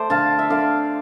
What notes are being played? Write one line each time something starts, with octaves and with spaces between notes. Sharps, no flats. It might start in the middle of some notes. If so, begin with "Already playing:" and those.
Already playing: A3 C5 D5
D3 F5 A5
E5
D3 D5 F5